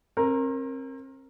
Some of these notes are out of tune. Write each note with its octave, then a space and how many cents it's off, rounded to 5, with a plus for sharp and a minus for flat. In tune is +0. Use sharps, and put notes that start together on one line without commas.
C4 +40 A#4 +0